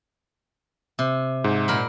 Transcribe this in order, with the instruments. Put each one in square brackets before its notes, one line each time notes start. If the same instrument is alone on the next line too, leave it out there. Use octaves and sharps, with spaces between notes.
[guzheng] C3
[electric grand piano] G#2
[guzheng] A#2 A#4 B5